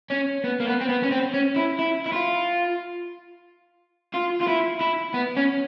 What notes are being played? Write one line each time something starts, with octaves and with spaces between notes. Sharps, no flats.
C#4
B3
A#3
B3
C4
B3
C#4
C4
C#4
E4
E4
E4
F4
F4
F4
E4
E4
B3
C#4